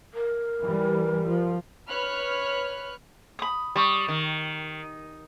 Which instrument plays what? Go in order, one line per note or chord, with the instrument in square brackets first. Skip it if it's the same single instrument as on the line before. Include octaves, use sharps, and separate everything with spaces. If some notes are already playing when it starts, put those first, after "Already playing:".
[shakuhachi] A#4
[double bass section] E3 G3
F3
[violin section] B4 C#5 B5 F6 F#6
[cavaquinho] B5 D#6
[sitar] G3 [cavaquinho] C#6 D#6
[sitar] D#3